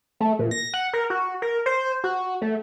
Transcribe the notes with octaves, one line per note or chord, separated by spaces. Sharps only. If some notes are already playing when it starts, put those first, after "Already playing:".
A3
A#2
A#6
F#5
A#4
F#4
A#4
C5
F#4
A3